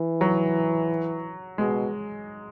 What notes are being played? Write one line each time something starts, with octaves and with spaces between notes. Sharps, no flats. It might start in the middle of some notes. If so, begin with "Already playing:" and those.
Already playing: E3
F#3
B2 G#3